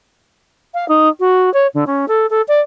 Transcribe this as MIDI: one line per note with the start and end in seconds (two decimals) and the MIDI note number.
0.74 0.88 77
0.88 1.09 63
1.20 1.52 66
1.54 1.67 73
1.74 1.84 50
1.87 2.06 61
2.08 2.26 69
2.30 2.42 69
2.48 2.60 74